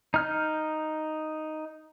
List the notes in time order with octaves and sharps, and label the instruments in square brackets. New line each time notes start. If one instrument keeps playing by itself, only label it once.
[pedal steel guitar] D#4 F6 G6